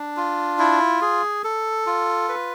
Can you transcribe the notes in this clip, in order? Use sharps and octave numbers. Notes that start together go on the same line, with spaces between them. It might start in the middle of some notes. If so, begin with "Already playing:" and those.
Already playing: D4
F4
E4
G#4
A4
F4
B4